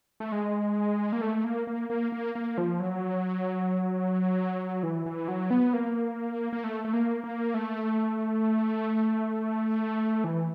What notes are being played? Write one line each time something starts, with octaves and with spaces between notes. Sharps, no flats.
A3
G#3
A#3
A3
A#3
A#3
A#3
A#3
A#3
F3
F#3
E3
E3
F#3
B3
A#3
A#3
A3
A3
A#3
A#3
A3
E3